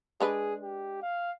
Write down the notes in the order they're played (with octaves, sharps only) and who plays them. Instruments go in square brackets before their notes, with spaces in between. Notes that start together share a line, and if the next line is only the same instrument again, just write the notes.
[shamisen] G#3 D4 B4 [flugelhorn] G#4
[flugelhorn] G4
F5